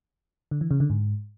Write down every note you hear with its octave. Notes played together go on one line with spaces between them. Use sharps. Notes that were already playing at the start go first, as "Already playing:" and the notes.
D3
E3
C#3
D3
G#2